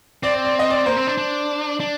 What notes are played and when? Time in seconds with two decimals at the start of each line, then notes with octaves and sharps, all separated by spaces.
0.23 C4 D5
0.34 D5
0.45 D5
0.59 D#5
0.70 D5
0.86 A#3 C5
0.96 C4
1.07 D4
1.18 D4
1.80 D4